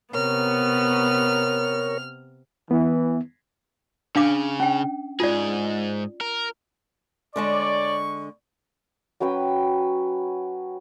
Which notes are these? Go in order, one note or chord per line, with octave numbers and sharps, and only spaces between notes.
C3 B3 A#4 C#5 F6
E3 B3
C#3 D4 F5 D6
C#4 G5
G#2 F4 G#4 D5
A#4
D3 G#3 C#5 D5 A5 C#6
F#3 C#4 B4 G5